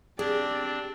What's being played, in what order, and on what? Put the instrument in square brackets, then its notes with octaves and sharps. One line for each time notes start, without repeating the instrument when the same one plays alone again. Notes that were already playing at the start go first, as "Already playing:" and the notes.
[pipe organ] C4 D4 [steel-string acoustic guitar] G4 [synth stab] G#4 [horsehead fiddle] D5